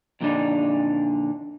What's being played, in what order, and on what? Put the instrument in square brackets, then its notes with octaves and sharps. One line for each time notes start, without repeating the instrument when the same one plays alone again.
[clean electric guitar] F2 A#2 D3 A3 D4 D#4